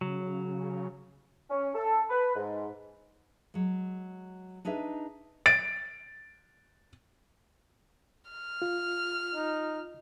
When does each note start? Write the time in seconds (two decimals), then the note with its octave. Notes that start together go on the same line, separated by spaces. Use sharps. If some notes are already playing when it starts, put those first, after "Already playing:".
0.01 C#3 F#3
1.50 C#4
1.75 A4
2.09 B4
2.36 G#2
3.54 F#3 G#3
4.65 D4 D#4 G#4 B4 E5
5.46 A6 D7
8.31 F6
8.62 F4
9.35 D#4